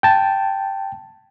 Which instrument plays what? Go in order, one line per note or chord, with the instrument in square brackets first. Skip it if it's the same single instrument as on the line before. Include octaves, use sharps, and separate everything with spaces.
[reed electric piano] G5 A5